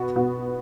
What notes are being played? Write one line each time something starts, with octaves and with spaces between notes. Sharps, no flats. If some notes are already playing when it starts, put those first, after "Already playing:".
Already playing: B2 B3 F#4
B2 B3 F#4